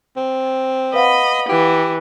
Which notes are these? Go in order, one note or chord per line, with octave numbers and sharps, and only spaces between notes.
C4
B4 D#5 F5 F#5 B5
E3 G4